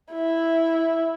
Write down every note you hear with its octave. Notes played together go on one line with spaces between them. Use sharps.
E4